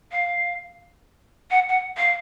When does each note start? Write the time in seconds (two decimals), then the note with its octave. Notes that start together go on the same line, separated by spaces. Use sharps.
0.12 F5
1.51 F#5
1.69 F#5
1.97 F5